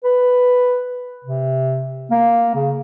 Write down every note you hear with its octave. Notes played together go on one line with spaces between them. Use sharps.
B4
C3
A#3
C#3